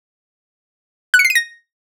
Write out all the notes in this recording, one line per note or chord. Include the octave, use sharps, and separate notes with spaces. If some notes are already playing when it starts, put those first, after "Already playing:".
F#6
C#7
C7
D#7
A#6